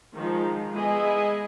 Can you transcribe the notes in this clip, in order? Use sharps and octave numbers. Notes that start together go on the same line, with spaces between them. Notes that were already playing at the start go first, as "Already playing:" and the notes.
D#3 F3 G#3
G#3 B3 E4 G#4 D#5 G#5